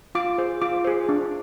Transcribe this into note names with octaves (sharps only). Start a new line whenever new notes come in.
F4 D6
G#4 C5
F4 D6
G#4 C5
D4